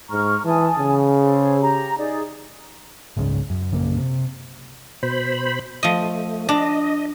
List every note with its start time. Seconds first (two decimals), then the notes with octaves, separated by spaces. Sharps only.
0.10 G#2 A#5 C#6 F6
0.45 E3 G#5 A5 D#6
0.78 C#3
1.21 G#4 A4 C5
1.61 G4 A#5
1.98 D#4 G#4 D5
3.17 F#1 C#2 G#2 C#3
3.50 F#2
3.72 A#1 F#2 C#3 A#3
3.97 C3
5.03 B2 C5 B5
5.83 F3 A3 D#5
6.49 D4 D#5